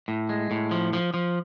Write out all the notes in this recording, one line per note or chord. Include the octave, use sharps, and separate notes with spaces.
A2
G#3
A2
F3
F3
F3